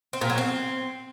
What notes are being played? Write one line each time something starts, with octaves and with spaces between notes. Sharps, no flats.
C4
A#2
F#3
C4